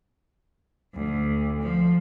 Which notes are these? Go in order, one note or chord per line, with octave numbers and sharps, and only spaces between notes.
D2
F3